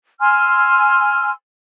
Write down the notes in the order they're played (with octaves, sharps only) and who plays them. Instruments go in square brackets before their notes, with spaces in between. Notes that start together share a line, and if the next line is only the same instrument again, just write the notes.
[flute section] G#5 C6 E6 F6